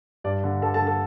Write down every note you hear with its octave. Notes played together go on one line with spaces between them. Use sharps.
G2 D5
D3
G2 A4 A5
A4 A5
D3
A4 A5